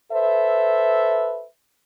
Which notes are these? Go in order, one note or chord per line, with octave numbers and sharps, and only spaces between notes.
A4 B4 C5 E5